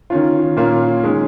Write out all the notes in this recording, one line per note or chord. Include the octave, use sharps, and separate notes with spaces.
D#3 C#4 F4
A#2 A#3 C#4 F4
D#3 G#3 C#4